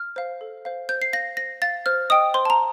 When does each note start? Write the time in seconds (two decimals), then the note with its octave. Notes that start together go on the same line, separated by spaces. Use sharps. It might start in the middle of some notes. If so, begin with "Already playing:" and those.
Already playing: F6
0.16 C5 F5
0.41 A4
0.65 C5 F5
0.89 C5 G6
1.02 C7
1.13 F5 A#6
1.37 C5 A#6
1.62 F5 A6
1.86 C5 F6
2.10 D#5 G5 D#6
2.34 C5 C6
2.45 A5
2.50 A#5